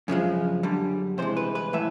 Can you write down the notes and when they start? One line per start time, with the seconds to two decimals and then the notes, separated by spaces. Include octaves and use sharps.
0.08 F#2 C#3 F3 G#3
0.63 F#2 D3 G3
1.18 C3 E3 G#3 C5
1.37 B4
1.55 B4
1.73 A2 E3 E5